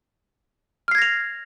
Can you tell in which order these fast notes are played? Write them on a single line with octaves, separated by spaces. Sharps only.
F6 C7 G#6 A#6 F7